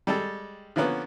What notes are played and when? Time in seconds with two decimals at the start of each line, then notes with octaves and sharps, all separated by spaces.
0.07 G3 G#3 A4
0.76 D3 F3 A#3 B3 C#4